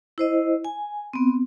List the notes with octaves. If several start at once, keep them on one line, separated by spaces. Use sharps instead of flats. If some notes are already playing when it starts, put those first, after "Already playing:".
E4 C5 D#5
G#5
B3 C4